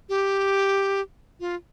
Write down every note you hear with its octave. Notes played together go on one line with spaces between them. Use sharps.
G4
F4